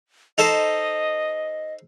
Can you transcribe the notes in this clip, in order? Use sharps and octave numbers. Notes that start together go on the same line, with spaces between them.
D#4 A4 C5 D#5